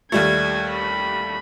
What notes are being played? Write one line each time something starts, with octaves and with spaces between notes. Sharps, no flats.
D#2 G3 A3 G#6
B5